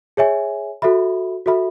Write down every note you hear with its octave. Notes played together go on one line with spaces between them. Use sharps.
G#4 C#5 E5 G#5
F#4 A4 E5 B5
F#4 A4 E5 B5